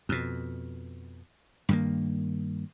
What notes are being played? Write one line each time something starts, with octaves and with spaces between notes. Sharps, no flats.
F2 B2
G2 D#3 A#3